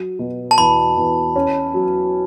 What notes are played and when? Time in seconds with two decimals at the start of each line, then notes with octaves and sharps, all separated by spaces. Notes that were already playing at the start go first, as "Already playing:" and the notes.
Already playing: F#3
0.19 B2
0.51 A5
0.58 E2 B5
0.96 E2
1.36 C#4
1.74 F#3